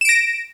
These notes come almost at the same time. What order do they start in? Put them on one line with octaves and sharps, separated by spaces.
E7 D7 A#6